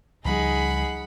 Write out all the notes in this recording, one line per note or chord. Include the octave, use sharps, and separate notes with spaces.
C#2 F3 G3 D#4 G#4 F#5 B5